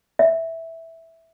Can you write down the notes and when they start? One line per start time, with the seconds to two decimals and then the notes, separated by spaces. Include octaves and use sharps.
0.19 E5